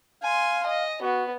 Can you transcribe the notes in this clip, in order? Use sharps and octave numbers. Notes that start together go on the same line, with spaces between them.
F5 G#5 C6
D#5
B3 F#4